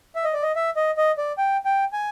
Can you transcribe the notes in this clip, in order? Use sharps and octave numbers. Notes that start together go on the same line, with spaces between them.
E5
D#5
D5
D#5
E5
D#5
D#5
D5
G5
G5
G#5